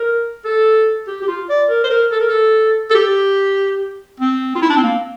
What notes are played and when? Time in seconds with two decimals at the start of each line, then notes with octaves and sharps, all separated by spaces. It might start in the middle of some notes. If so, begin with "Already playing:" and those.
Already playing: A#4
0.45 A4
1.07 G4
1.22 G4
1.28 F4
1.49 D5
1.69 A#4
1.84 C5
1.90 A#4
2.11 A4
2.20 A#4
2.29 A4
2.91 A4
2.95 G4
4.20 C4
4.55 F4
4.62 E4
4.69 D4
4.77 C4
4.83 A#3